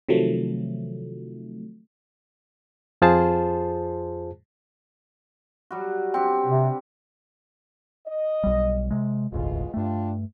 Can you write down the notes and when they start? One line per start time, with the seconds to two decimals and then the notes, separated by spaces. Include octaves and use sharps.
0.09 C3 D#3 F3 F#3 A3
3.02 F2 F4 G#4 C5 A5
5.71 F#3 G3 F#4
6.14 C4 D4 G4 G5
6.46 C3
8.06 D#5
8.44 B1 G3
8.91 C3 G#3
9.32 E1 A1 D2 B2 G#3 F4
9.74 G2 A3 D4 F4 G5